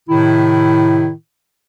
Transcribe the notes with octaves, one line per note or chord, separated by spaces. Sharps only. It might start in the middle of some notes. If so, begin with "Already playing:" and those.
A2 C3 D#3 E4